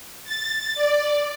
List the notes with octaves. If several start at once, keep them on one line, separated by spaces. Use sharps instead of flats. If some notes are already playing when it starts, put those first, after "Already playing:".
A6
D5